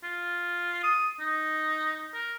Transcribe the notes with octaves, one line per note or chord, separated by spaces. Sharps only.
F4
D#6
D#4
A#4